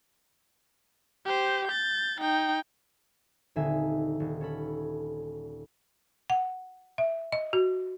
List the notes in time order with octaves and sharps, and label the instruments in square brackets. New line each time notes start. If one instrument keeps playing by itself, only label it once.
[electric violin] G4 C5
G6 A6
D#4 G5
[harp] D#1 D3 C4 D#4 E5 G#5
D#1
C#4 A4 B5
[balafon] F#5
E5
D#5
F#4